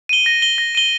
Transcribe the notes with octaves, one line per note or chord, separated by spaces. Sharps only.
D#7 G7
A#6
G7
A#6
D#7 G7